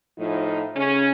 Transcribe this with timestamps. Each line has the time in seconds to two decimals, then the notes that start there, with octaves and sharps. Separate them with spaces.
0.18 A2 F3 D#4
0.75 C#3 C#4